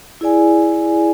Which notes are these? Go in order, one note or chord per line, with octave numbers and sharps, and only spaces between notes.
E4 G#4 D5 G#5